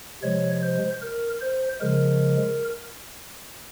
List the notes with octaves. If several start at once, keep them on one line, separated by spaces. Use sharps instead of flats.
C3 F3 G#3 C#5
C5
A#4
C5
C#3 F3 G#3 A#4